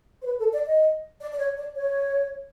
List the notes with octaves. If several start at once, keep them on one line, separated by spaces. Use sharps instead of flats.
C5
B4
A4
D5
D#5
D5
D5
C#5
D5
C#5